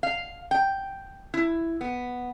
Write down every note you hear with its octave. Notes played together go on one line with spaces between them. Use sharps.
F5
G5
E4
B3